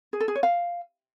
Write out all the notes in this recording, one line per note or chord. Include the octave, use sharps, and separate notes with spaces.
G#4
A4
G#4
C#5
F5